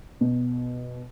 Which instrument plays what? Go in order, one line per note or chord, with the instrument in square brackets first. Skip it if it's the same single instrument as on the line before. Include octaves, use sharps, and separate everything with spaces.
[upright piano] B2